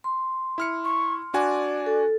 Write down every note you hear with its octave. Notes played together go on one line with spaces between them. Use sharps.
C6
E4 F6 C#7
C#6
D4 F#4 D5 G#5
A4